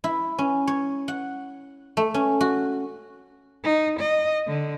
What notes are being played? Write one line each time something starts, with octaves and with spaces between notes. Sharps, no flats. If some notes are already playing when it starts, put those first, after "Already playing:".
E4
C#4
C#5
F#5
A3
C#4
F#4
D#4
D#5
D3